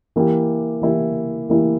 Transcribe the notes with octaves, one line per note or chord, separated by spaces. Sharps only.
E3 A#3 E4 G4
E3 A#3 E4 G4
E3 A#3 E4 G4